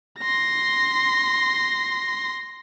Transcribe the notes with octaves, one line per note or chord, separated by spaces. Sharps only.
C6 A#6